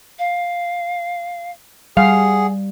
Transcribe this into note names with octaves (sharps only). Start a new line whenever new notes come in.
F5
G3 G#4 F5 F#5